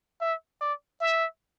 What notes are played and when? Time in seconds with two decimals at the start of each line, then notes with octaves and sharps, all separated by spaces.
0.21 E5
0.61 D5
1.01 E5